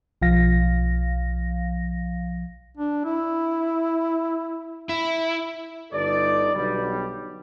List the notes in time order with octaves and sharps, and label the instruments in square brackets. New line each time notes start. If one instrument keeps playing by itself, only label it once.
[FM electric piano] B1 F3 F5 A#6
[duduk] D4
E4
[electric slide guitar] E4
[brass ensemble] G1 G2 D#4 A4 D5
B1 B2 D3 G3